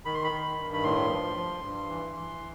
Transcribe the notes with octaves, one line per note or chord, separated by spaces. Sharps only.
D#3 B5
C6
B5
D#3
G2
B5
A2 C6
F3
F3
G2
E3
E3